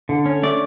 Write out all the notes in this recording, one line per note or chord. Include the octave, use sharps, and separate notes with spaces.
D3
C#4
A3 D5